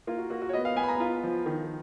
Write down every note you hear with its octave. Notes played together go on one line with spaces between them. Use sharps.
A#3 F4
F#4
A#3 F#4
F#4
C#5
B3 D#5
F5
B3 G#5
B5
A#5
F4
F3
D#3